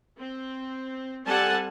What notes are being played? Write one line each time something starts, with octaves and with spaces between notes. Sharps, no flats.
C4
G3 C4 A4 F#5 G#5 A5